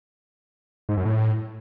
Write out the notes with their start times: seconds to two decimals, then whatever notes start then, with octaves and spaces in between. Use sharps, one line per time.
0.89 G#2
0.97 F#2
1.05 A2